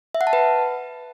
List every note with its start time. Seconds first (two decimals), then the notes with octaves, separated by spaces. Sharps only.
0.15 E5
0.21 F#5
0.27 A5
0.33 B4